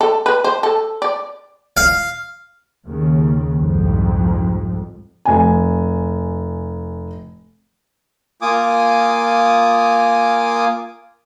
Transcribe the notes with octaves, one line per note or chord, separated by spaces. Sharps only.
A4
B4
C5
A4
D5
F5
D#2 C#3
C2 F2 G#2
F1 G#5
A#3 F4 G#5 D6 D#6